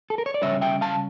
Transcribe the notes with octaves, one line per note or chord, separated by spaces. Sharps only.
A4
A#4
C#5
D5
C#3 G3 C#4 C#5 E5
E5 G5
F5 A5